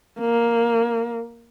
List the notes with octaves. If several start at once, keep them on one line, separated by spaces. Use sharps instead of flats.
A#3